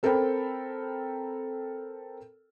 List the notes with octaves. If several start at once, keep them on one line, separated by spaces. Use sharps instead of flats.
C4 A4 A#4 C5 G5 B5